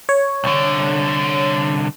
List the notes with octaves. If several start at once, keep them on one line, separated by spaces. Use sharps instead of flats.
C#5
C2 D3